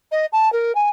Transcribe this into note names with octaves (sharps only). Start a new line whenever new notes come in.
D#5
A5
A#4
G#5